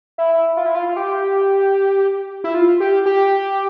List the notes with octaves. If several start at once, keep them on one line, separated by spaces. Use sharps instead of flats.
E4
F4
E4
F4
F4
G4
E4
F4
G4
G4